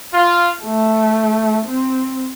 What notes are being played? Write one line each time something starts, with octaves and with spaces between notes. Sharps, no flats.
F4
A3
C4